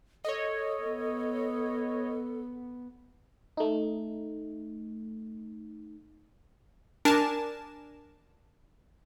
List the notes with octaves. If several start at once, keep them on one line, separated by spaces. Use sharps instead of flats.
A4 C#5 D#5
B3
A3 D#4
D4 A#4 G#5 A5 E7